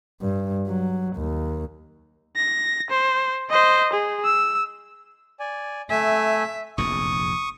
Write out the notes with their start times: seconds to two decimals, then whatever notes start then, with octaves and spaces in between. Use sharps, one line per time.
0.22 G2
0.67 F#3
1.17 D#2
2.36 A#6
2.90 C5
3.50 C5 D#5
3.93 G#4
4.25 E6
5.40 D5 G#5
5.90 A3 E5 G#5
6.78 F1 A#1 E2 C#6 D#6